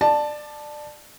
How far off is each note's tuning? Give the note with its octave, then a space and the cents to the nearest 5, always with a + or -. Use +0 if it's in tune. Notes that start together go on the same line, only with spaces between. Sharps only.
D5 +20 A5 +0